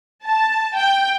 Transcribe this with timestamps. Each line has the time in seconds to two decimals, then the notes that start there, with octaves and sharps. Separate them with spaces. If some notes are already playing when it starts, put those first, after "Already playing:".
0.24 A5
0.74 G5